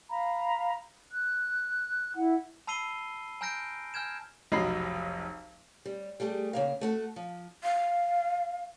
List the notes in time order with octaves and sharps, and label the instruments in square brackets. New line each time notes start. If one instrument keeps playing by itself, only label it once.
[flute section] F5 A#5 B5
F#6
E4 F#5
[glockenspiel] A5 B5 E6 C7 D#7 G7
G#5 A#5 F6 G6 A#6 D7
G#5 F6 G6 G#6 E7
[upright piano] F1 B1 F#3 D#5 B5 C7
[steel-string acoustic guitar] G3
G3 A3 G4 G#4
C#3 A#3 F5
A3 F#4 A4
F3
[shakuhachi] F5